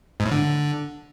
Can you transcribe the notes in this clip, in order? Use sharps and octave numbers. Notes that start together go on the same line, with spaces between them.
G#2
A2
D3